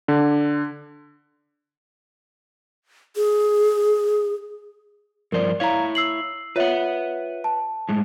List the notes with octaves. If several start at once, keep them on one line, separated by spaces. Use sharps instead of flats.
D3
G#4
G2 F3 A#4 C5 D5
E4 C#5 F5 A#5
E6 C7 F#7
F4 B4 C#5 E5 F#5
A5
A2 G#3